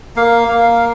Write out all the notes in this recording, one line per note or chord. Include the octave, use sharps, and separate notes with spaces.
A#3 F5
A#3